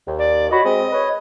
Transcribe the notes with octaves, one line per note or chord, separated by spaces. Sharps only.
D#2
D5
F#4 C#5 D#5 B5
G#3 C4 D#5
B4 C#5